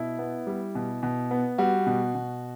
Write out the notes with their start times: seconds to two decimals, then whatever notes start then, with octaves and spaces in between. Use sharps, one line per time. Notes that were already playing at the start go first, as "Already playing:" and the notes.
Already playing: B2 E4
0.19 B3
0.47 G3
0.75 B2
1.03 B2
1.31 B3
1.58 G3 F#4
1.86 B2
2.15 B2